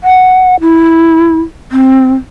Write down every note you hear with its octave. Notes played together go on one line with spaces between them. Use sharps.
F#5
E4
C4